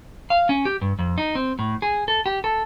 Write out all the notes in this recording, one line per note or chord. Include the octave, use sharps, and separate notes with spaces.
F5
C#4
G4
G2
F2
D#4
C4
A2
G#4
A4
G4
A4